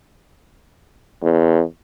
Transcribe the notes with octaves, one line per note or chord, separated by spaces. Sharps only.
E2